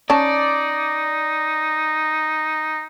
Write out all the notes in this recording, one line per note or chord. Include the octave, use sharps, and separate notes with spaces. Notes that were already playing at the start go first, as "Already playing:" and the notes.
C#4 D#4 D5 A5